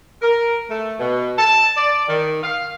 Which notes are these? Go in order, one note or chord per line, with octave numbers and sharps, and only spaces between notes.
A#4
A3
B2
A5
D5
D#3
F5